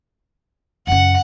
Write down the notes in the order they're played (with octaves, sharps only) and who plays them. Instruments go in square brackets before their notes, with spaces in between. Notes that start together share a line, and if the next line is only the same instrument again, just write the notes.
[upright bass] F#2 C#3 [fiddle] F#5